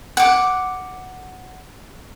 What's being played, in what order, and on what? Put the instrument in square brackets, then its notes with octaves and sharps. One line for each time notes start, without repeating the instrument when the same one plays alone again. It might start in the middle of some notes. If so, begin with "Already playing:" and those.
[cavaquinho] F#5 D6